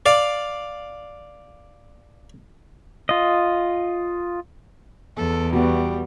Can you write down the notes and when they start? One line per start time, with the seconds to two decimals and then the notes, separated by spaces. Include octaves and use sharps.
0.06 D5 F5
3.09 F4 D#5
5.17 E2 A4
5.53 G3 B3 F#4